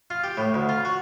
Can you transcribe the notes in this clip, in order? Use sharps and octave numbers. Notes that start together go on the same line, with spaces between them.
F4
G4
A2
D2
F4
F#4